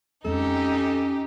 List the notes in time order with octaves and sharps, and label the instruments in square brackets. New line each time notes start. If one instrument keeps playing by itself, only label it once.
[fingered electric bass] F2 G#3 C4 [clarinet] C#4 [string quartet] D#4 G4 [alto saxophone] A4